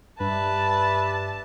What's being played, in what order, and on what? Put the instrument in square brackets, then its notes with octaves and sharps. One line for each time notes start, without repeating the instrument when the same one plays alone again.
[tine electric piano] G2 [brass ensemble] G4 D5 E5 [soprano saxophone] B4 [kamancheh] A5